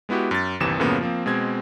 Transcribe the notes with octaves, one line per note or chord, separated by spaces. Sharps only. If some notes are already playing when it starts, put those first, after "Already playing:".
G#3 B3 E4 F#4 G4
F#2 A6
G1 D#2 C3 E3 E7
F#2 A2 C#3 F3 A#3 B3
F3 A#3 C4
B2 G#3 C4 G#6